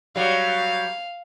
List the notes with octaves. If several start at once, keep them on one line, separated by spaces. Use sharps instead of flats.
F#3 G3 F5